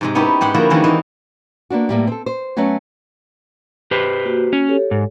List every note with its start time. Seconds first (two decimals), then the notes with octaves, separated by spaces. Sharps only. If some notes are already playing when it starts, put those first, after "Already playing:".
0.01 G#2 C3 G#3
0.15 B3 C#4 D#4 E4 G4
0.41 G#2 G4 F#5 C6
0.54 D3 F3 A#3 E4 F#4 G#4
0.70 D#3 E3 G#3 A#3 C#4 E4
0.84 E3 C4 D#4 G4
1.70 A#3 B3 D4 F#4
1.89 A2 G3 A#3
2.07 C4 A4
2.26 C5
2.56 F#3 A3 B3 C#4 F#4
3.91 G4 B4 C5
4.25 A#3 F#4
4.53 C#4
4.68 G4 A4 C#5
4.91 G#2